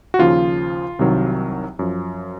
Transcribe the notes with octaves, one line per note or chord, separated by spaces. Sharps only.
F#4
D#2 C#3 F3 F4
C2 C3 D#3 F#3
F#2 F3